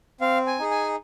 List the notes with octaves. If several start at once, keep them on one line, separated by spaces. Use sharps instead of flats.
C4 F5
G#5
D#4 G#4
G#5